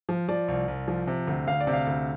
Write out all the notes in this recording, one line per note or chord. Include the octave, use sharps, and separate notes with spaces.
F3
F3 D5
C2
C2
F3
C3
D2
D2 F5
D5
C3
F5
D2